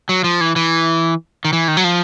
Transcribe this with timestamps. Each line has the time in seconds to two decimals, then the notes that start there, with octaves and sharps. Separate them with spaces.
0.09 F#3
0.24 F3
0.41 E3
0.56 E3
1.45 D#3
1.53 E3
1.68 D#3
1.77 F#3
1.84 F3